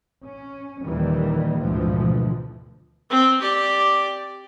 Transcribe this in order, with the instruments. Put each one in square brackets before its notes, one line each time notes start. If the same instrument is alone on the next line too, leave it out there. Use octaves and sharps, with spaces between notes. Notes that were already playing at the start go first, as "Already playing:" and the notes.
[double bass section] C#4
D#2 A#2 D#3 E3 G3
A1 D2 G#2 B2 E3 F3
[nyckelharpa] C4
G4 D5